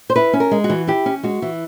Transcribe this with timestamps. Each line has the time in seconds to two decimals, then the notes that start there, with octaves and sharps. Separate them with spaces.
0.10 C5
0.16 E4 B4
0.33 C#4
0.40 A#4
0.51 G#3
0.64 F#4
0.70 E3
0.87 E4 G4
1.06 C#4
1.23 G#3 F#4
1.42 E3